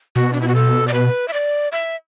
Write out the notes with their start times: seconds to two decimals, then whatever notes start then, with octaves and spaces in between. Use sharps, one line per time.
0.15 B2 F#4
0.33 D4
0.41 E4
0.48 F#4
0.55 A4
0.88 D5
0.94 B4
1.28 E5
1.33 D5
1.72 E5